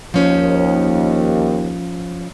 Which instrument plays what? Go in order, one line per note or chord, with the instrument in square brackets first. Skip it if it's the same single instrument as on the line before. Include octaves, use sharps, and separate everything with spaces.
[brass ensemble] D#2 [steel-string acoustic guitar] F3 C#4 C5